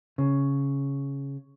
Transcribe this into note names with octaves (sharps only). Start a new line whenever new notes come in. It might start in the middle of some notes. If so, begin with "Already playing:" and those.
C#3